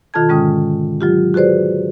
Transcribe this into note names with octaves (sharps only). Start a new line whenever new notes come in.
B2 D#3 F4 A4 A5 G#6
G#2 D3 G#3 C#4 G5 D#6
F#3 F4 G4
F#4 G#4 B4 C5 D5